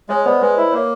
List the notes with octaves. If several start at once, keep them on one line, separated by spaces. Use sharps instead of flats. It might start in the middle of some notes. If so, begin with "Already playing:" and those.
G#3 C#5 D#5
B3 C5 D5
G#3 B4
E4 C5
A#3 C#5